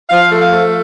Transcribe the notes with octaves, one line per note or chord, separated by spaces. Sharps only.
F3 F5
A3
F5
A3